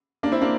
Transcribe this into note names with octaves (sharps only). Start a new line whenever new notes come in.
A#3 D4
C4 E4
A#3 D4